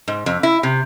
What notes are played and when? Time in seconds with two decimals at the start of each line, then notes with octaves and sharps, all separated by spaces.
0.08 G#2
0.26 F2
0.43 E4
0.63 C3